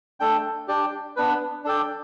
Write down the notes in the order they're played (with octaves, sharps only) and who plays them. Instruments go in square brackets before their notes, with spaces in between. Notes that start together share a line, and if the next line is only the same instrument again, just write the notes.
[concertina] A3 D4 A4 G5
D4 G4 D5 G5
B3 D4 B4
D4 A4 D5 G5